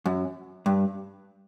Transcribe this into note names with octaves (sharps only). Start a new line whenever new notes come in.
F#2
G2